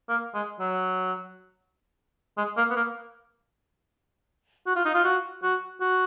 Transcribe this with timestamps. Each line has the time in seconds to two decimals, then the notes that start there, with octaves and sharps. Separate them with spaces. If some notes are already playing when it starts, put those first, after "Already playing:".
0.09 A#3
0.34 G#3
0.60 F#3
2.38 G#3
2.57 A#3
2.71 B3
2.76 A#3
4.66 F#4
4.76 F4
4.85 D#4
4.95 F4
5.04 F#4
5.43 F#4
5.81 F#4